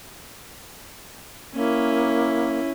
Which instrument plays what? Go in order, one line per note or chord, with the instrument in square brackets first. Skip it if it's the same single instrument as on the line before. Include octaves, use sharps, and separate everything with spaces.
[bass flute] A#3 [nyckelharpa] C#4 E4